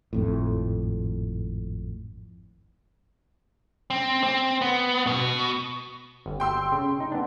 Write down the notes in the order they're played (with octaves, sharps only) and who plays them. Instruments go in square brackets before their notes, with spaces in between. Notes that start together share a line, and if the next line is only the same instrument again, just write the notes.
[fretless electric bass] G#1 F2 A2
[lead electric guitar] C4
C4
B3
B2
[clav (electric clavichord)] G1
[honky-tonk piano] G5 C6 E6
[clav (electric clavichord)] C#3
D#4
B3 D4